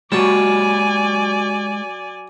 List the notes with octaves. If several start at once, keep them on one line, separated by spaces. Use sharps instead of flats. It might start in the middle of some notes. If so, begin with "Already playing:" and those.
F#3 G#3 F#4 G4 C#5 D5 G#5 A5